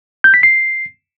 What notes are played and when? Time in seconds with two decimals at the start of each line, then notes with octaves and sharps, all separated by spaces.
0.24 G6
0.34 B6
0.43 C7